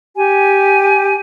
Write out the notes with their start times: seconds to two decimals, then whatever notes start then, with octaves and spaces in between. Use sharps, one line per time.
0.15 G4 G#5